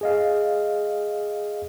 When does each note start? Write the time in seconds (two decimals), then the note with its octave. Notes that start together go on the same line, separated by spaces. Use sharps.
0.01 G#4 D#5 F5